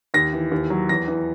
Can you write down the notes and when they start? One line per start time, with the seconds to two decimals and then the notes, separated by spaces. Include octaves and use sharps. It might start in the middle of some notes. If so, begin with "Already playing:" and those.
0.14 D#2 A#6
0.33 E3
0.52 D#2
0.70 F#3
0.89 E2 A#6
1.08 E3